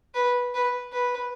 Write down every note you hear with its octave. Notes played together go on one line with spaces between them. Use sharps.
B4
B4
B4